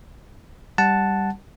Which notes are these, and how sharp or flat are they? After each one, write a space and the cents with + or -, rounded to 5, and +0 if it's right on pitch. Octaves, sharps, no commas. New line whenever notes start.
G3 +0 F#5 +0 A5 +0